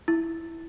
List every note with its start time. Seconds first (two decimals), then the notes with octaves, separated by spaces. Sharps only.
0.08 E4